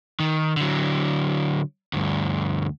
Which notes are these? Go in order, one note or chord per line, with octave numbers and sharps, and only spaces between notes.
D#3
D3 F#3
D2 G2